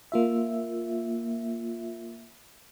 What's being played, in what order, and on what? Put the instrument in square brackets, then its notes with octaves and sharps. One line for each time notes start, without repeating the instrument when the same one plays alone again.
[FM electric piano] A#3 F4 E5